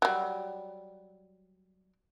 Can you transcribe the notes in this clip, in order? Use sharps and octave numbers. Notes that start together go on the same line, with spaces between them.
F#3 G3